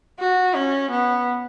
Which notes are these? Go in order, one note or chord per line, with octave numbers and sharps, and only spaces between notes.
F#4
C#4
B3